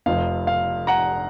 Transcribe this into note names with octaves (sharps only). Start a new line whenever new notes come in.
F1 F2 C3 F5
F5
F#5 A#5